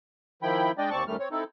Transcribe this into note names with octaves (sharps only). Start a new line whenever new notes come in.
D#3 F3 E4 G5 B5
G#3 D4 D5 D#5 G5
D#2 C4 D5 A5 C#6
F#2 A2 D#3 G3 A3 F6
C4 C#5
C4 D#4 E4 A4